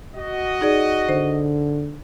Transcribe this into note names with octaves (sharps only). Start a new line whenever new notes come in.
F#4 D#5
D#4 G#4 D5
D3 C5